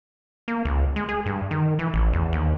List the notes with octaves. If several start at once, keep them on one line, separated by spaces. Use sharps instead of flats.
A#3
C#2
G#3
G#4
G2
D#3
E3
A1
E2
D#2